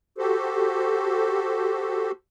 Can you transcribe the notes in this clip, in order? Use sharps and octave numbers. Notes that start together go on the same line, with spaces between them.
F#4 G4 A4 C5